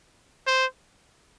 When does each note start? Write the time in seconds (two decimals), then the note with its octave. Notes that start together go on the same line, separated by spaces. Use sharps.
0.47 C5